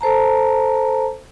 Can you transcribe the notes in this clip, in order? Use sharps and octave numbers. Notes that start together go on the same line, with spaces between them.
A4 C5 A5 A#5